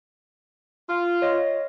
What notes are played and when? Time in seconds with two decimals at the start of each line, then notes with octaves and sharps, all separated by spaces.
0.89 F4
1.22 C#5 D#5